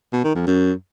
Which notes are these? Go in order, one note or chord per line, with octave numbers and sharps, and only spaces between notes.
B2
D#3
F2
F#2